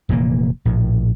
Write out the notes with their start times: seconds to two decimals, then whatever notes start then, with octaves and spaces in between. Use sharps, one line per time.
0.09 F1 A#2 E3 A#3
0.65 A#1 A2